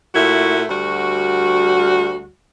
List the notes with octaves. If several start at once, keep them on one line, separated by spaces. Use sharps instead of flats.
A#2 A3 E4 F#4
D2 G3 F#4